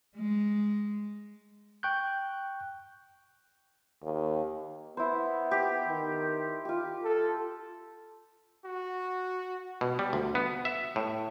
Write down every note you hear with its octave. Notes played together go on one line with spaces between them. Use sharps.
G#3
G5 C#6 F#6 G6
D#2
B3 E4 C5
G4
D#3
F4 G4
A4
F#4
B2
G3
D2
B3
E5
A2